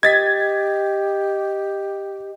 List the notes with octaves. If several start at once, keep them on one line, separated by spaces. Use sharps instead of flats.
G4 D#5 G#6 A6 B6